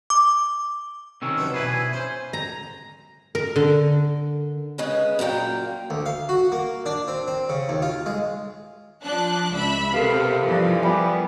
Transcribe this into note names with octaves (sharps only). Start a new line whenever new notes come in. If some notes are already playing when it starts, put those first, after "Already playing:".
D6
C3 D#3 C#4 E6
D3 F#3 B3
G2 B2 E3 E4 G#4 B4
G#5
C#4 C5
A#5
A#4
D3
C#3 G#3 G#4 B4
F#2 A#2 A#3 G5
D2
F5
F#4
A#3
D4
C4
C4
C#3
D#2
F4
G#3
F3 D4 F#6
C#2 E5 B5
C3 B3 G4 A4 A#4 F5
G2 E3 F3
G3 B3 G#5